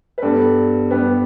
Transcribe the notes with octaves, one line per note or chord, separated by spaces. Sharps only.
B4
G2 G3 B3 A4 D5
G2 G3 B3 G4 B4